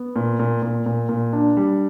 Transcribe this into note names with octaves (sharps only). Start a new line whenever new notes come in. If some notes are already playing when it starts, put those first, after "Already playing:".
Already playing: B3
A#2
A#2
A#2
A#2
A#2
D4
G3